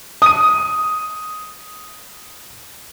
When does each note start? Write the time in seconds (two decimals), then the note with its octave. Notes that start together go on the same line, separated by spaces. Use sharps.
0.22 D#6 D#7